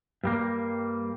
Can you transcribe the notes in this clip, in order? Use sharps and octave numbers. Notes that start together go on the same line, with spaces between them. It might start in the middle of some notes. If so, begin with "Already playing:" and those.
G2 G3 A#3